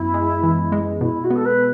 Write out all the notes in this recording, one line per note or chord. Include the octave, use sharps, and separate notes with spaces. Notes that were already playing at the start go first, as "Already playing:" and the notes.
Already playing: F#2 B3 E4
G#3
E3
G#3
B2 E4
F#4
B3 A4
B4